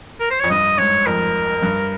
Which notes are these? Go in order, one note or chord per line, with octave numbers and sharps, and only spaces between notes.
A#4
C5
F2 C#5
G2 D#5
G#2 C#5
F2 A#4
G2